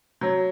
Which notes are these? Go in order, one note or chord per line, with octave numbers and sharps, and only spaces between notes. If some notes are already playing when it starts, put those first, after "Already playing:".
F#3